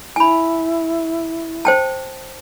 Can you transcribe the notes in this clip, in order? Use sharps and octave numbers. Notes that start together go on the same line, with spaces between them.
E4 G#5 B5
C5 G5 A5